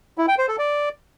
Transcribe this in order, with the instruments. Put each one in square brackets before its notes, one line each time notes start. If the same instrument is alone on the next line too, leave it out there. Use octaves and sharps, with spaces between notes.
[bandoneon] E4
G5
C5
A4
D5